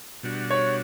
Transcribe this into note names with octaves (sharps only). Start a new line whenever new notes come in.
B2 G3 D4 F#4
C#5